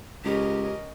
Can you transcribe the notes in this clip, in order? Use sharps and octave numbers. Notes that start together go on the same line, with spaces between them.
C#2 C#4 G4 A#4 D#5